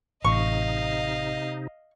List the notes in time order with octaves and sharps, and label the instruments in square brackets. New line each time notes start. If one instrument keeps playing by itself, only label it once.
[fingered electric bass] A1 [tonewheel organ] C3 D#4 [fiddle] D#5 F5 [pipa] C#6